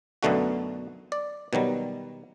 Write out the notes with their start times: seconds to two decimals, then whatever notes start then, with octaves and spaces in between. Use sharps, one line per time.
0.23 B1 F#2 B2 D3 A3 F#4
1.12 D5
1.53 B2 D#3 F#3 G3